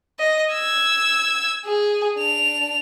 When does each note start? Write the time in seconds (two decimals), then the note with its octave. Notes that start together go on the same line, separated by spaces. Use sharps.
0.19 D#5
0.53 E6 G#6
1.65 G#4
2.17 D4 F7